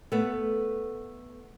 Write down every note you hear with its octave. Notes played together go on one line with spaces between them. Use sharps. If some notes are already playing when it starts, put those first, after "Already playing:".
A3 B3